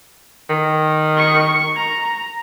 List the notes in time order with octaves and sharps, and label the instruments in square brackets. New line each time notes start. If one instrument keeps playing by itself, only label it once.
[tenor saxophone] D#3
[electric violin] C#6 C#7
A#5